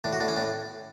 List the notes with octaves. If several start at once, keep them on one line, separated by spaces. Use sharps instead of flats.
A2 D4
F#4
A2 D4
C#4
A2 D4